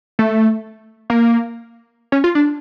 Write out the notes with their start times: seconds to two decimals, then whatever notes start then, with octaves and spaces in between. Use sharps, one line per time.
0.19 A3
1.10 A#3
2.12 C#4
2.24 F4
2.35 D4